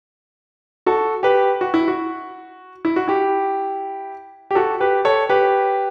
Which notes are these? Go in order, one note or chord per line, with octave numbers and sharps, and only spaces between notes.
F#4 A4
G4 B4
F#4
E4
F#4
E4
F#4
E4 G4
G4
F#4 A4
G4 B4
A4 C#5
G4 B4